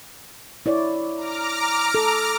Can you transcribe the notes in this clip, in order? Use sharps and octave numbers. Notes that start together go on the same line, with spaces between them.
E4 C#5 D5
A#5 D6 F6
A4